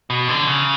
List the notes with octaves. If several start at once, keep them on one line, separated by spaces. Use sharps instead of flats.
B2
D3
C#3